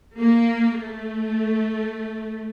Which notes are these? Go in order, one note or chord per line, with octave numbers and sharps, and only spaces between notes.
A#3
A3